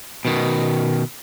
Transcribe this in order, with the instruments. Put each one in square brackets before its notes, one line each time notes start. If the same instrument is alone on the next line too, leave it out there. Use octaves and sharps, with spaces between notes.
[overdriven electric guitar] B2 D#3